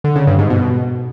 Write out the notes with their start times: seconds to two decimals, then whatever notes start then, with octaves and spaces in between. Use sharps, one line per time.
0.04 D3
0.16 C#3
0.27 G2
0.39 G#2
0.50 B2